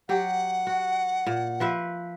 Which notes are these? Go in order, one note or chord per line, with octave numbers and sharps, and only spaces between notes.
F#3 G4 F#5
F#4
A#2
F3 B4 E5